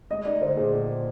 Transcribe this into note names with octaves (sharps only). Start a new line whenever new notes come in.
G#3 D#5
D#4 D5
D3 C5
A#2 G#4
A#1